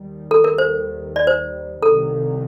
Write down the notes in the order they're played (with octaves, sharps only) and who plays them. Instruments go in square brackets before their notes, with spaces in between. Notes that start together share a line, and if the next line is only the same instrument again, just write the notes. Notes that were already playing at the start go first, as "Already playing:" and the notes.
Already playing: [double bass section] D#2 D#3 G3
[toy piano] A4
A#4
C5
D5
C5
[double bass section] C2 C3 D#3 [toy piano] A4